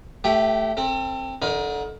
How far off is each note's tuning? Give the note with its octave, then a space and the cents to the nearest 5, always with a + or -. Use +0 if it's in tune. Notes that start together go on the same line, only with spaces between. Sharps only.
A3 +0 G4 +0 G5 -35
C4 +15 A4 +40
D3 -15 D#4 +25 A#4 +20